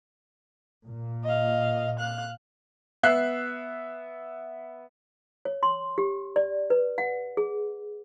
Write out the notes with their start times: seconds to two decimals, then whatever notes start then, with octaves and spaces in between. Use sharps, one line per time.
0.88 A#2
1.24 D#5 F5
1.99 F5 F#6
3.03 B3 E5 F#6 C7
5.45 C#5
5.63 C6
5.98 G4
6.36 D5
6.70 B4
6.98 F#5
7.37 G#4